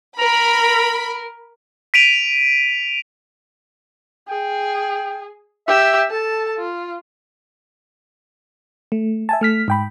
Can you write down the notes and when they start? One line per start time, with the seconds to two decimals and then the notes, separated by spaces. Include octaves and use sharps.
0.19 A#4 A#5 B5
1.94 B6 D7 D#7 F7
4.29 G#4 G5
5.67 G4 E5 E6
6.11 A4 A5
6.58 F4
8.92 A3
9.29 E5 G#5 A5
9.41 A3 F6 B6
9.68 G#2 G5 B5